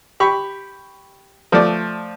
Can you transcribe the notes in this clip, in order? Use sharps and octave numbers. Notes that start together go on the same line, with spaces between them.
G4 B5 C#6
F3 A3 D5